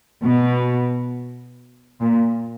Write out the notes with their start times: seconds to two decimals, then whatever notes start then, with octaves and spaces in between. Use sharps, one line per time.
0.23 B2
2.00 A#2